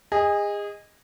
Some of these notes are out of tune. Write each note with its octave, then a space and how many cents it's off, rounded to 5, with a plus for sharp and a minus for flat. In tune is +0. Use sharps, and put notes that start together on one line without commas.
G#4 -30 D#5 +0